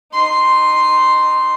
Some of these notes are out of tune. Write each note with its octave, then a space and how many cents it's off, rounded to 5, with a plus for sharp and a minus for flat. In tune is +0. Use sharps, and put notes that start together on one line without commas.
D#4 -20 C6 +0